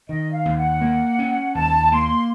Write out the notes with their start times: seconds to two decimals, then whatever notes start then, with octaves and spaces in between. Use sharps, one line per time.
0.09 D#3 D#5
0.32 F5
0.45 D#2
0.57 F#5
0.81 A#3
1.19 C#4
1.55 D#2 A5
1.92 A#3 C6